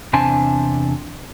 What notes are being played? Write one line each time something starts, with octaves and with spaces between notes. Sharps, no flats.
E2 C3 C4 D4 G#5 A5